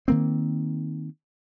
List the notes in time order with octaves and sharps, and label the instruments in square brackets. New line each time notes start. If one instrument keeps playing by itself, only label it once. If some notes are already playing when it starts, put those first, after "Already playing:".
[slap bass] D#3 A#3 C4